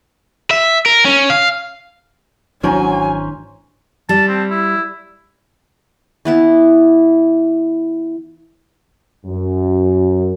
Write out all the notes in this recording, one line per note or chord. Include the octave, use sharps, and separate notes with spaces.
E5
A#4
C#4
F5
G#1 E3 F#3 C#4 D4 C5 G#5 A#5
G3 A5
C4
E4
E3 B3 E4
F#2